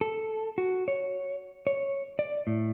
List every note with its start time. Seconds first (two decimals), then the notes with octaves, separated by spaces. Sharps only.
0.01 A4
0.58 F#4
0.88 C#5
1.67 C#5
2.19 D5
2.47 A2